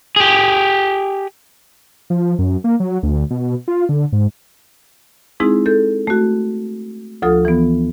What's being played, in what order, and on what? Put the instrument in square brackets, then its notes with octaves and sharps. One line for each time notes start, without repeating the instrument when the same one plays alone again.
[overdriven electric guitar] G4 G#4
[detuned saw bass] F3
F#2
A#3
F#3
D2
B2
F4
D3
G#2
[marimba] G#3 C4 D#4 E4 G#4
A4 G6
A3 F#4
D2 F3 F4 A4 D#6
E3 B3